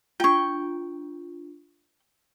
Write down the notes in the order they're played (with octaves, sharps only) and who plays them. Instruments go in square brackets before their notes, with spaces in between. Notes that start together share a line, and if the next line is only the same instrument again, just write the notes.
[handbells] D4 F4 [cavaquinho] G5 C#6